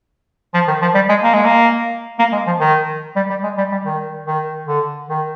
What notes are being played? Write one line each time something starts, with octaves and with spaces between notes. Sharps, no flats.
F3
D#3
F3
G3
G#3
A#3
G#3
A#3
A#3
G#3
F3
D#3
G3
G3
G#3
G3
G3
D#3
D#3
D3
D#3